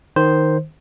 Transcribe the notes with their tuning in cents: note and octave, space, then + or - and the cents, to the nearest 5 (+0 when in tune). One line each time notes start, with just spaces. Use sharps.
D#3 +0 C5 +0